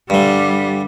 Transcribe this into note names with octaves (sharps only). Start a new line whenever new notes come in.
G2 D3 G3